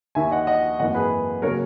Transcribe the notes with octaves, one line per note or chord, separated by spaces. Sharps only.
D#2 D#3 A#3 E5 G#5
D#5 F#5
D#5 F#5
G#1 F#2 E3 A#3 D#5 F#5
G#4 B4
C#3 F#3 A#3 A#4 C#5